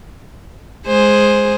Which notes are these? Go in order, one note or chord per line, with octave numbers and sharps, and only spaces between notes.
G#3 G#4 C5